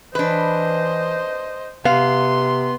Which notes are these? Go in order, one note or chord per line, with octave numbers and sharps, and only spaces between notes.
E3 D4 B4 C5 D#5
C3 B3 F5 C6